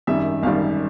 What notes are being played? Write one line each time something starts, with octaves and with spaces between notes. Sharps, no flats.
G#1 F#2 D#3 G3 E5
G#1 F#2 D#3 G3 F5